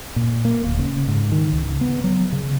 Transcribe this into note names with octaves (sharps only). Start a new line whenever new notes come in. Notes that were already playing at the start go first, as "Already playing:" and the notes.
A#2
A#3
D1
C#3
G#2
D#3
C#2
B3
F#3
C#3